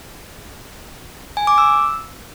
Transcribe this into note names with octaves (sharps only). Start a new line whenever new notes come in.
G#5
D6
E6